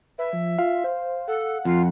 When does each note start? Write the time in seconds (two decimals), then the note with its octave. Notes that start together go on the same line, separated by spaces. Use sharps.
0.18 B4 E5
0.33 F3
0.59 F4 F5
0.84 C5
1.28 A4 F#5
1.65 F2 F4